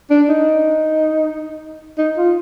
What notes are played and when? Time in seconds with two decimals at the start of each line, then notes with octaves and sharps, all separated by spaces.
0.10 D4
0.29 D#4
1.98 D#4
2.17 F4